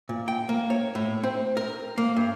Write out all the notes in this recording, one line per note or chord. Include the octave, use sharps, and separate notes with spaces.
A#2
G5
A#3
C#5
A2
C4
A#4
A#3
G2